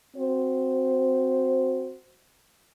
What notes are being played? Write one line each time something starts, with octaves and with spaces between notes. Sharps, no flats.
C4 F#4 C5